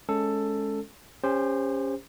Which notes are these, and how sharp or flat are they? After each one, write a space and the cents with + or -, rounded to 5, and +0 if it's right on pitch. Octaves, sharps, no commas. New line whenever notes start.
G#3 +20 C#4 +5 A4 +10
C#4 +0 G4 +40 C5 +0